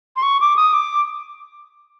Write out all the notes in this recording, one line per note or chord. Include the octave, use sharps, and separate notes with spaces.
C6
C#6
D6
D#6
D6